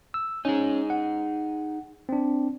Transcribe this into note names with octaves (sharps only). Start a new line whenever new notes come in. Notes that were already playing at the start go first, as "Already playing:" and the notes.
E6
C#4 D#4 G#4
F#5
C4 D4